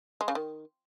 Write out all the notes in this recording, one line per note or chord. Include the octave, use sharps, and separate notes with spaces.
G#3
C#3
D#3